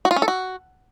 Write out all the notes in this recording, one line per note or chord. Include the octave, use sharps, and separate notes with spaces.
F#4
F4
C#4
A4
F#4